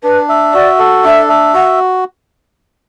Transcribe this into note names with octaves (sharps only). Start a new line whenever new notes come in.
D4 B4
E5
F#4 D5
A4
D4 E5
E5
F#4 F#5